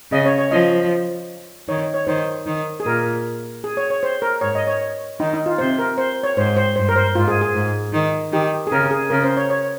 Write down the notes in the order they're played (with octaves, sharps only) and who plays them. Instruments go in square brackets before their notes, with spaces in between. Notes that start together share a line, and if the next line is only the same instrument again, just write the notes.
[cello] C#3 [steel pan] D#5
[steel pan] C#5
C#5
[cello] F3 [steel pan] D#5
[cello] D#3 [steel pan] C#5
[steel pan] C#5
[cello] D#3 [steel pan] C5
[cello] D#3
[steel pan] G#4
[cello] A#2 [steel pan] A#4
[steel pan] G#4
C#5
C#5
C5
A#4
[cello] G#2 [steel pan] C#5
[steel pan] D#5
C#5
[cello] D#3 [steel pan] D#4
[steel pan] D#4
F4
[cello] C3 [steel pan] C5
[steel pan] A#4
C5
C#5
[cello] G#2 [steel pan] C5
[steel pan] C5
[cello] G2 [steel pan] C5
[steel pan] A#4
C5
[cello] G#2 [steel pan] F4
[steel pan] G#4
G#4
[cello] G#2
D#3
[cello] D#3 [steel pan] G4
[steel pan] G#4
[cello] C#3 [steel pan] A#4
[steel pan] G#4
[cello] C#3 [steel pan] A#4
[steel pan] C5
C#5
C#5